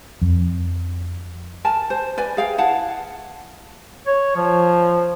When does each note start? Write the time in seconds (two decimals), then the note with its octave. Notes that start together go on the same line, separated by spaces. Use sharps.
0.22 F2
1.65 A#4 G#5 A5
1.90 C5
2.18 B4 D5 G#5
2.37 G#4 F5 G5
2.58 E4 F5 F#5 A5
4.07 C#5
4.36 F3